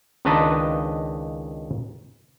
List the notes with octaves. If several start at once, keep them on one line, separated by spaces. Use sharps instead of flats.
C#2 D#3 D4 B4 D#5 A5